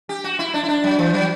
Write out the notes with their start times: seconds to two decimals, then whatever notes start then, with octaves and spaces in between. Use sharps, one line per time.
0.09 G4
0.24 F#4
0.39 E4
0.54 D4
0.64 E4
0.69 D4
0.84 F#3
0.99 E3
1.13 F#3